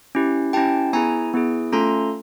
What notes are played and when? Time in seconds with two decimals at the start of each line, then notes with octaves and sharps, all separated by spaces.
0.15 C#4 E4 G4
0.53 C#4 E4 G4 G5 A5
0.93 B3 E4 G#4 G#5 A#5
1.34 B3 E4 G#4
1.72 A3 C#4 F4 A4 A#5 C6